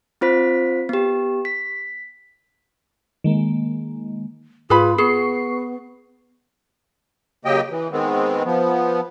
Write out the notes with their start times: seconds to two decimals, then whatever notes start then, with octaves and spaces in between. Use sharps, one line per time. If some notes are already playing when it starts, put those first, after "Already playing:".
0.21 C4 F4 C5 B6
0.89 B3 G4
1.45 B6
3.24 D#3 G#3 A#3
4.70 G#2 F4 G#4 B4 B5
4.98 B3 G#4 C#6 C7
7.45 C#3 F#3 A#3 G4 D#5 G5
7.71 E3
7.92 D#3 G#3 B3 C4
8.45 F3 B3